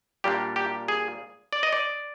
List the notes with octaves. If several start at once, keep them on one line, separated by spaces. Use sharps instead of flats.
A#2 G3 A#3 D4 G4
G4
G#4
D5
D#5
D5